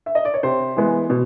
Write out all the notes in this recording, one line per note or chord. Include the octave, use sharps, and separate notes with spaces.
E5
D#5
D5
C#5
C3 C5
E3 G#3 B3
B2